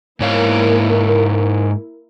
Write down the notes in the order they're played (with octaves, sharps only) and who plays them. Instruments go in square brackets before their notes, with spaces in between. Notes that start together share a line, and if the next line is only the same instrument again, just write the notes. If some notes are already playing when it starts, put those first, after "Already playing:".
[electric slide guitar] G#2 C#5 F5 [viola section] A#3 E4 A#4